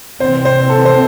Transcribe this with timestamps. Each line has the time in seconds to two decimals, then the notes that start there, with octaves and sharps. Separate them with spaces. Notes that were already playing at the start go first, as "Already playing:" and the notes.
0.20 C3 E3 C4 C5
0.45 C5
0.69 A4
0.85 C5